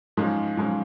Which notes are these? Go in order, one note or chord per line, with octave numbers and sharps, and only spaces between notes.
G#2 F3 G#3 C#4
G#2 F3 G#3 C#4